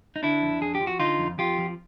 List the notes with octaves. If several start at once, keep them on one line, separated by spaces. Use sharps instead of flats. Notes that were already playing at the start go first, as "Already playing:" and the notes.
D#4
D3 D4 E4
F2
F2 G#4
G4
F3
F#4
D3 D#4 F4
F2
F2 F4 G4
F3